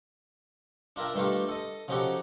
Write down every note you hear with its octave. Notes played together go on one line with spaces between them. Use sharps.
D4 F4 A#4 E5 G5
G2 D#3 A3 F4 G4
A4 D#5
C#3 F3 D#4 F#4 G4 A4